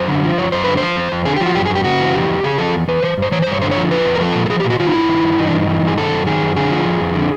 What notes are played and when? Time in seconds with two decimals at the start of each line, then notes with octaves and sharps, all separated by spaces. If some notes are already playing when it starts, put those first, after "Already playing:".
Already playing: F#2 C5
0.08 D3
0.23 F3
0.38 F#2 C#5
0.52 F#2 C5
0.64 D3 B4
0.77 C5
0.82 F3
0.97 F2
1.12 F2
1.25 D3 G#4
1.36 F3 G4
1.46 F#4
1.55 F#2 G4
1.65 G#4
1.70 F#2
1.75 G4
1.84 C#3 F#4
2.00 E3
2.14 F2 G4
2.29 F2
2.44 C#3 G#4
2.58 F3 A4
2.74 E2
2.88 E2 B4
3.03 E3 C5
3.18 G2 C5
3.32 E3 C#5
3.42 G2 C5
3.52 C#5
3.62 D3 C5
3.71 C#5
3.77 F3
3.91 F2 B4
4.05 F2
4.15 A#4
4.20 F3 A4
4.35 A#2
4.46 A4
4.50 F3 G#4
4.60 A#2 G4
4.70 F#4
4.80 D#3 F4
4.87 D#4
4.94 G2 E4
5.09 D#3
5.23 G2
5.38 E3 D#4
5.47 D4
5.54 G2 D#4
5.68 E3
5.82 G2 G#4
5.98 D#3 A4
6.12 F#2
6.26 D#3 G#4
6.42 F#2
6.56 D3 G#4
6.71 F3
6.86 F2
7.01 F2
7.15 D3